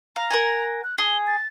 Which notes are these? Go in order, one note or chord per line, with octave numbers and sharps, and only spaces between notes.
F5 A#5
A#4 F#5 G#5
F#6
G#4 G7
A6